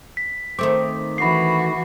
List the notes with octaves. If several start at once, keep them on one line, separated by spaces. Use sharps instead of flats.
B6
D#3 A3 C4 D6
E3 F#4 B5 C7